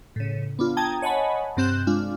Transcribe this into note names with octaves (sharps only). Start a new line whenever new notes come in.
A2 C#3
B3 D4 F4
G5 A5 A#5 D#6 G#6
C#5 D#5 F#5 G#5 A5 B5
G2 C3 C4 F#6 G6 E7
G#3 D4 F4